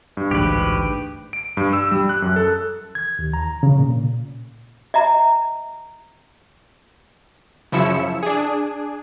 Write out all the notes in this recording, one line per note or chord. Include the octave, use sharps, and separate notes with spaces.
G2
A1 D2 G#2 G4 B4
D7
G2
E6
G3
F#6
F#2
A4
G#6
D#2
A#5
C#3
A#2
D#5 E5 A#5
F#2 C#3 F3 E4 E6 C#7
D4 G#4